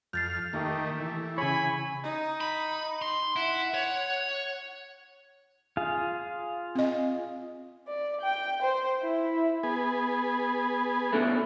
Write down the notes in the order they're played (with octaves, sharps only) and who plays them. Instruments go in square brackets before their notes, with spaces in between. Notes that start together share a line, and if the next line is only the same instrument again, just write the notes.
[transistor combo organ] F2 F6 [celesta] G6 A6 C7
[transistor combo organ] D#3 A#3 [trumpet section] A3 G4
[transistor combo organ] E3
[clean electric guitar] C#3 G#4 C#5 [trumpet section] G#5 B5
[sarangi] D#4
[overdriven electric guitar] B5
C6
[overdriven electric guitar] E4 [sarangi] F#5
[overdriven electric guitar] C#5
[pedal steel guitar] F4 G#4 F5
[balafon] C4 D#5
[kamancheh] D5
G5
C5
E4
[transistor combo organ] B3 G#4
[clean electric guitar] B2 D3 A3